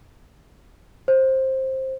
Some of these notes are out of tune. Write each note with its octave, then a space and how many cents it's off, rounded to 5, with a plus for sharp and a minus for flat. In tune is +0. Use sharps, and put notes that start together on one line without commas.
C5 +15